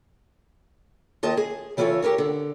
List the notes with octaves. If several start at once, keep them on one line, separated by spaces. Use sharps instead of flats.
D#2 F4 D#5 A5
G#4
C#3 E3 F4 G4 A4 C#5
G4 G#4 A#4 C#5
D3